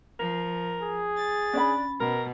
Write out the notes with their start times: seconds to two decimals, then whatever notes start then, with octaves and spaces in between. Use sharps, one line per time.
0.19 F3 A#4
0.82 G#4
1.17 A6
1.53 C#4 D4 D5 B5
2.00 B2 A#4